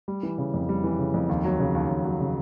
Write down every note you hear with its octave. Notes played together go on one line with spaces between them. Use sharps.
G3
E3
C#3
F2
G3
E3
C#3
F2
D#2
F#3
C#3
D#2
D#2
F#3
C#3